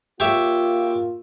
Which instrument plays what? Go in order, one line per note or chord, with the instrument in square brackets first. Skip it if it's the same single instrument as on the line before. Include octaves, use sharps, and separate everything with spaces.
[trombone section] A#3 F4 [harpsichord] G4 C#5 E5